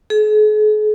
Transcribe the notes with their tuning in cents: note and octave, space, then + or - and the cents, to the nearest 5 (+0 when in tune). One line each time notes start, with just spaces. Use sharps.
G#4 +45